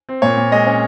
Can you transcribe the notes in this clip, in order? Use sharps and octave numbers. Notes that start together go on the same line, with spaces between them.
C4
A#2 C#5
A#2
G#3 D#5
C#4